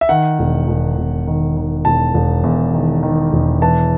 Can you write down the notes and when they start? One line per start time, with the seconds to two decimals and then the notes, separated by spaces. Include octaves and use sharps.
0.01 E5
0.09 D#3 F#5
0.39 E1
0.68 E1
0.98 E1
1.27 D#3
1.57 D#3
1.85 E1 A5
2.14 E1
2.44 E2
2.74 D#3
3.03 D#3
3.33 E1
3.62 E3 A5